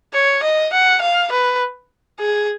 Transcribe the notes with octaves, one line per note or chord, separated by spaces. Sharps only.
C#5
D#5
F#5
F5
B4
G#4